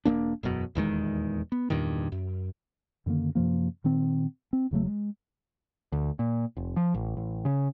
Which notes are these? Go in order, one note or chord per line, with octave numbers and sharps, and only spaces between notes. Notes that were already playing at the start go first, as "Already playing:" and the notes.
E1 A#2 A#3 D4
E1 F#2 B2 F#3
D#1 E2 D#3 G#3
B3
E2 G2 A#2 D#3
F#2
F#2 D3 D#3 A#3
F#2 C3 F3 A#3
A#2 D#3 C4
C4
E1 C#3 F#3 A3
G#3
D2
A#2
F1
F3
A1
A1
C#3